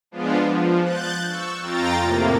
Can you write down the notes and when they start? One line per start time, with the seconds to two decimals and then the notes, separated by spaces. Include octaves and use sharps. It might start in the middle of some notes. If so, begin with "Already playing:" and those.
0.11 F3 G#3 B3 D4 F4
0.50 F3
0.81 F#6 G6 A6
1.29 C#6 E6
1.61 F2 F4 G5 A#5 A6
2.00 A2 C3 A#3